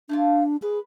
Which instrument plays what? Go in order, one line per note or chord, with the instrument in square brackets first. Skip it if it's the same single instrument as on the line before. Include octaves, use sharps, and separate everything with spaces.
[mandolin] A3 A#3 F4 [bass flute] D4
[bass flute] G#4 [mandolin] B4